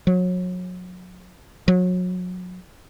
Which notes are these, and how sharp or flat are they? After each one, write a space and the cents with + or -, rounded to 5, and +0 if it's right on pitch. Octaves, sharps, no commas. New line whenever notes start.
F#3 -30
F#3 -30